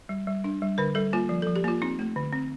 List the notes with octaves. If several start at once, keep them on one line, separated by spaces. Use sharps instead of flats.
G3
G3
D4
G3
D3 A#4
G3 A4
A#3 F4
F3
F3 A4
G4
A#3 F4
C4 D#4
A3
D3
C4